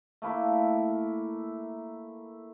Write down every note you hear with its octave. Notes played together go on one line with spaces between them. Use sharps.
A3 A#3 E4